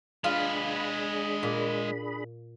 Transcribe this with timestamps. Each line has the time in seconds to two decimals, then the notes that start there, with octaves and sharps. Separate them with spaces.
0.24 G#3 D4 F4 G#4 B4 B5
1.43 A#2